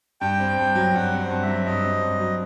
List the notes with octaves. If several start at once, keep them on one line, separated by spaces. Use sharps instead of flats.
G2 G5
C4
G2
F#3
G2 F#5
C4
F#5
G2
E5
F#3
G2 D#5
C4
G2
F#3